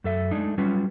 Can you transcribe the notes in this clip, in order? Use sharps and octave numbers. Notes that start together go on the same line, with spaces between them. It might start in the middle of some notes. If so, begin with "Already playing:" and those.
F#2 A4 E5
G#3 A3 D4 D#4
F#3 G3 C#4 F4 F#4 B4